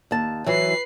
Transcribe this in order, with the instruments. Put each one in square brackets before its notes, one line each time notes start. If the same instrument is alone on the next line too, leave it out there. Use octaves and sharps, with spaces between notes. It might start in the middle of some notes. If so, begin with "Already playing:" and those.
[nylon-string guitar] D#2 A5
[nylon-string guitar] E3 F#3 [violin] B4 C7